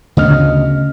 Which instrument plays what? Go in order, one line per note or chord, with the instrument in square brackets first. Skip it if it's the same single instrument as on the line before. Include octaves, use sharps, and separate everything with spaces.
[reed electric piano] D2 D#5 F6 [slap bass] C#3 B3